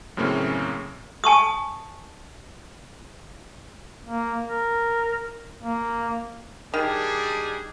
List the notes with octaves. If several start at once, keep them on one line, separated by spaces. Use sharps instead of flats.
F#2 A2 C#3 A#3 C4 C#4
G#5 A5 C#6 D#6
A#3
A#4
A#3
D#3 G3 D4 G#4